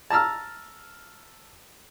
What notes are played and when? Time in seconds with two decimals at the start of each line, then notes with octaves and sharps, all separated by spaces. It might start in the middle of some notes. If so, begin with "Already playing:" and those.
0.10 A5 A#5 E6 F6